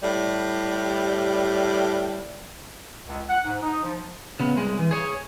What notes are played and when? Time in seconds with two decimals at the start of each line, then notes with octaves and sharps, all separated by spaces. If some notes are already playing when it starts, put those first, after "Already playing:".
0.01 A2 G3
3.07 C#2
3.29 F#5
3.45 G#2
3.62 D#4
3.83 F3
4.40 C#3 B3
4.56 C2 G#3
4.79 E3
4.91 G#4 C#5